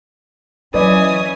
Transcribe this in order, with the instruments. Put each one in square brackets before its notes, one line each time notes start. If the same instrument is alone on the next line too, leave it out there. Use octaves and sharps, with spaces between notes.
[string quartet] E3 C#4 [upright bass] F#3 [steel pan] B4 D5 D#5 [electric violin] G#5 D#6